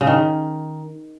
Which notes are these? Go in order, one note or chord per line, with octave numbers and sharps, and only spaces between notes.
C#3
D#3